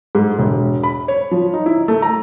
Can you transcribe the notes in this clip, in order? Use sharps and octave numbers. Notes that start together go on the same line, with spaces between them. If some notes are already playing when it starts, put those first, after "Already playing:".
G#2
E1
B5
C#5
F3
D#4
E4
A3
A#5